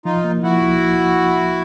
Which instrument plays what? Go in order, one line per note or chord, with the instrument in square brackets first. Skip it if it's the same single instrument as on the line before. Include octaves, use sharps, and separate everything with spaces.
[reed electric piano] F3 [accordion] D#4 F4
[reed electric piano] A#3
[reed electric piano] F3 [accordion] E4 F#4
[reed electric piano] C2